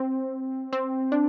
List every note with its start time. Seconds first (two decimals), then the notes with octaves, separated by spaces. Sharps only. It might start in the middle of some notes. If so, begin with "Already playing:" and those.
Already playing: C4
0.73 C4
1.12 D4